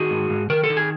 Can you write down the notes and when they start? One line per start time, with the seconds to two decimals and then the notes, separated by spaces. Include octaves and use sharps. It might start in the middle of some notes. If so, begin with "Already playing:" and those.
Already playing: D#3 F#4 G#4
0.11 G#2
0.30 G#2
0.50 D#3 A#4
0.64 A4
0.70 D#3
0.77 G#4